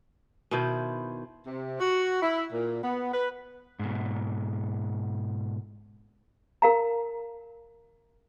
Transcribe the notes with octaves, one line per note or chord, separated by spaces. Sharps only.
B2 D#3 E4 C5
C3
F#4
E4
A#2
B3
B4
G#2 B2
A#4 F5 A#5